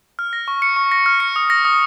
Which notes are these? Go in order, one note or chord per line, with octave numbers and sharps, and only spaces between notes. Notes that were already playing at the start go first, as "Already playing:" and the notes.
F6
A#6
C#6
C#7
C#6
A#6
F6
C#7
D#6
A#6
D#6